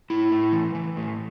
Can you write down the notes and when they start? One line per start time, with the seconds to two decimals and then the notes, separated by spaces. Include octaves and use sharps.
0.10 A2 E4
0.32 A2
0.52 E3
0.75 E3
0.97 A2